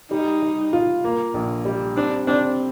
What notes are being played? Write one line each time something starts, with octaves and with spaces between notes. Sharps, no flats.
G3 D#4
G3
F4
A#3
A#1
G3
C4 D4
C4 D4